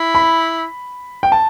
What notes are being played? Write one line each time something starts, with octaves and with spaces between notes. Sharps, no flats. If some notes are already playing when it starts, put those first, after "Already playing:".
Already playing: E4
B5
G5
A5